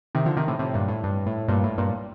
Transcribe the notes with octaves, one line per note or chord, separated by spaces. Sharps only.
C3 D#3
D3 F3
C3 D#3
A2 C3
A2 C3
G2 A#2
A2
G2
A2
G2 A#2
A2
G2 A#2